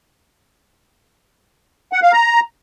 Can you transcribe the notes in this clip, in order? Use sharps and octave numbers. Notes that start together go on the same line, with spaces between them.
F#5
F5
A#5